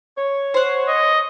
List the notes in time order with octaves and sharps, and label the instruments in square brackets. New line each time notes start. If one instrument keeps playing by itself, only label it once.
[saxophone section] C#5
[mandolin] C5 F#5
[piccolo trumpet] D#5